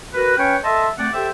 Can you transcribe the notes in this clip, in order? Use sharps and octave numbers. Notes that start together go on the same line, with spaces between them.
F#4 A#4 B4
C#4 B4 C#5 G5
A4 D#5 E5 A5 C6
A3 C4 D5 F#5
G4 A4 C5 E5 G5